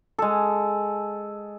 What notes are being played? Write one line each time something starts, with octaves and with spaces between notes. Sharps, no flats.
G#3 A4